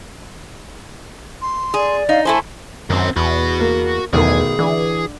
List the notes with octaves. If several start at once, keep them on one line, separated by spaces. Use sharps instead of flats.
C6
G#4 D5
D#4 F5
A3 E4 C5 G#5 A5
F#2 D#3 C4
E2 F#4 B5
A#3
B1 E2 D#3 A3 G#4
D3 E3